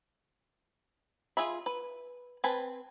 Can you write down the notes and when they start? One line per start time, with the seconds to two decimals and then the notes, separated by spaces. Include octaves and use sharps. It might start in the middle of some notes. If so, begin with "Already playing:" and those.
1.37 F4 G#4 E5 B5
1.66 B4
2.44 C4 B4 G#5 A5 B5